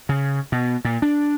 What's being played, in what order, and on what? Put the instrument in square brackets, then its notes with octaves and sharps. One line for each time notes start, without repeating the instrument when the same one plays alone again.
[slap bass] C#3
B2
A#2
D4